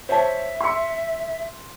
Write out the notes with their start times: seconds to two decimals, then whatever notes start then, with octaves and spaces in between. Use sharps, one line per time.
0.09 C5 C#5 E5 A5
0.61 C6 E6 C#7